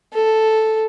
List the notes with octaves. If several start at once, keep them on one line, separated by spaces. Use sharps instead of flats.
A4